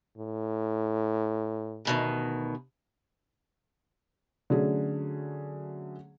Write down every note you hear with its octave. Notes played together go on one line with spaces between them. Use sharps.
A2
D2 B2 D#3
D3 F#3 A3 C#4 G#4